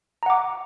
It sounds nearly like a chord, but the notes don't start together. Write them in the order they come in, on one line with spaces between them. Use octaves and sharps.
A#5 F#5 D6